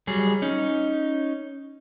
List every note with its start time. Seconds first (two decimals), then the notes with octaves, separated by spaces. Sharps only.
0.07 F#3 G3 G#4
0.42 C#4 D#4